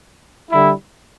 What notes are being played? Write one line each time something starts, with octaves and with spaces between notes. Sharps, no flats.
D3 G3 E4